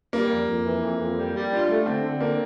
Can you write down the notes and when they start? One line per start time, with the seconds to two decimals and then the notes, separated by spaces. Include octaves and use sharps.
0.13 G3 A#3
0.31 F2
0.48 F2
0.66 E3
0.82 F2
1.00 F2
1.17 G3
1.35 G3
1.52 D4 F4
1.70 A3
1.86 D3 C4
2.04 D3
2.21 A#3 D4